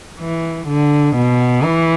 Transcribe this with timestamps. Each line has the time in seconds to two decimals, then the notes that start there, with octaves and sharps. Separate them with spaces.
0.20 E3
0.68 D3
1.16 B2
1.64 E3